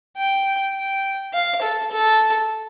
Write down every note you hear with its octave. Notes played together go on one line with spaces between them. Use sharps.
G5
G5
F5
A4
A4